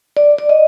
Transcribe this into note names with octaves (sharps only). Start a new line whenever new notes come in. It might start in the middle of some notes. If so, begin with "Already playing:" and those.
D5
D5
D#5